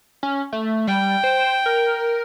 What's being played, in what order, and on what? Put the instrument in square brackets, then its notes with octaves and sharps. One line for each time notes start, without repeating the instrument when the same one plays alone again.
[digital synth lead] C#4
A3
[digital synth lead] G3 [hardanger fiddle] G5
[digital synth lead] C5
A#4